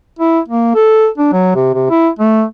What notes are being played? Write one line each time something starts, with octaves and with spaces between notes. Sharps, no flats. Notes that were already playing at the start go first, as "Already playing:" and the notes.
E4
A#3
A4
D4
F#3
C3
C3
E4
A3